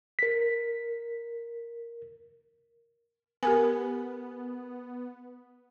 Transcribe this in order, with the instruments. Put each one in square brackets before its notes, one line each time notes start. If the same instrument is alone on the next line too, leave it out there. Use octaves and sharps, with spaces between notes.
[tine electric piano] A#4 B6
[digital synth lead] B3 [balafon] G4 A#4 G#5